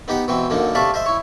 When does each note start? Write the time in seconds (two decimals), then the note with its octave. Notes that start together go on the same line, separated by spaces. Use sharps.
0.08 B3 D#4 G4 D#5 F#5
0.28 B2 E3 C4 G5
0.50 F#2 D3 A#3 D#4
0.75 C3 A3 A4 D5 F5 B5
0.94 C5 D#5 E5
1.06 E4 C#5